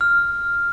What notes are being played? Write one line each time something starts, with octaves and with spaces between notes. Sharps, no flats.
F6